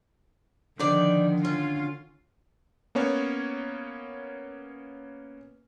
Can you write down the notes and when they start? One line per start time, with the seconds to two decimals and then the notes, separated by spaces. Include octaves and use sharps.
0.80 D3 D#3 F3 D#4 D5
1.45 C#4 F4
2.95 A#3 B3 C#4 C#5